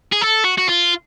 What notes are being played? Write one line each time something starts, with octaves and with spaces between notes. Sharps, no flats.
G#4
A4
F#4
F#4
F4